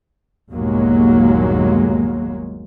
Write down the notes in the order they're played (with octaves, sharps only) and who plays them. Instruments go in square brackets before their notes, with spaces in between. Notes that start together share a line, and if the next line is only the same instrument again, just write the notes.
[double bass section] G1 D#2 A#2 F#3 G#3 A#3